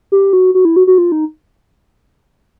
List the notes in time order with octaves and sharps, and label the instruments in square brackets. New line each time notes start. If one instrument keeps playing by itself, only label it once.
[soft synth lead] G4
F#4
F#4
E4
F#4
F#4
F4
D#4